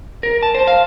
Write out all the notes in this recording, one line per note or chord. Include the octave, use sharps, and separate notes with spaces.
A#4
A5
C5
F5